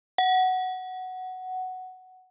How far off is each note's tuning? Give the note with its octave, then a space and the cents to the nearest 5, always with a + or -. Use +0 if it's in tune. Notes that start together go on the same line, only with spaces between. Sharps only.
F#5 +5